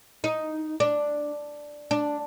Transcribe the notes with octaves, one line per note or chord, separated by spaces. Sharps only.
D#4
D4
D4